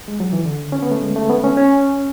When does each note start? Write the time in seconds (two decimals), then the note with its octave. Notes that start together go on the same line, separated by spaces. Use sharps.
0.08 G#3
0.20 F#3
0.33 E3
0.45 D3
0.72 C#4
0.82 B3
0.91 A3
1.02 G#3
1.16 A3
1.30 B3
1.44 C#4
1.57 C#4